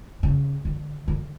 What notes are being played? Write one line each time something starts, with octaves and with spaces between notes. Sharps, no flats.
C#3
D3
D3